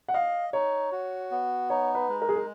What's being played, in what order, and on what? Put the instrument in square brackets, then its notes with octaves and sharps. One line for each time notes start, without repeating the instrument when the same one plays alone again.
[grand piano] F#5
[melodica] D#5 [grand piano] F5
[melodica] D#4 [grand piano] C#5
[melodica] F#4
B3
[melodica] D#4 [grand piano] C#5
[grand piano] B4
[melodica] G#3
[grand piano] A#4
G#4
A#4